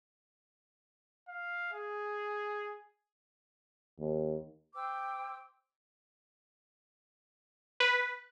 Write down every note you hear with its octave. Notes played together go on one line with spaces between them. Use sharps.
F5
G#4
D#2
C5 G5 D6 E6
B4